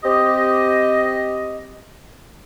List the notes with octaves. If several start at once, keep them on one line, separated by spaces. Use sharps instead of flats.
C4 G4 D#5